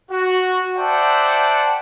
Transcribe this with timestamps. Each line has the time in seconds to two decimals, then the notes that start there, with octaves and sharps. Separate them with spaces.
0.11 F#4
0.77 C5 D5 E5 F#5 G5 A5